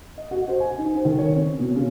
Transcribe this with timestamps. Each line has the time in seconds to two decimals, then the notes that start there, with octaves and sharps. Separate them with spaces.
0.18 D#5
0.31 F#4
0.48 C5
0.60 G#5
0.78 D#4
0.93 C5
1.05 D#3
1.19 C#5
1.36 C4
1.59 B2
1.75 C#3